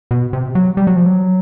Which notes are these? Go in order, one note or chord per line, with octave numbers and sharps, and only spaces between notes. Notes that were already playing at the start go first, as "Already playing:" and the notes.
B2
C3
F#3
G3
F#3
F3
F#3